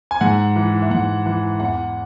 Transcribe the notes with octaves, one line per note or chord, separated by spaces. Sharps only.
G#5
G#2 F#5
E3
E5
G#2 F#5
E3
E2 F#5